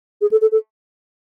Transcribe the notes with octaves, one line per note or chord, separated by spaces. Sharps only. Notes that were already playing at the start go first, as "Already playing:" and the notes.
G#4
A4
A4
A4